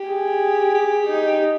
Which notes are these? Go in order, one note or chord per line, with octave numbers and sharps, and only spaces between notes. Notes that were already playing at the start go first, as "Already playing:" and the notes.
Already playing: G4
G#4
G4
D#4